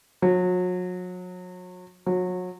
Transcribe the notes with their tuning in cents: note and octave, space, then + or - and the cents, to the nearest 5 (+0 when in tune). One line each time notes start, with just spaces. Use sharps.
F#3 -35
F#3 -30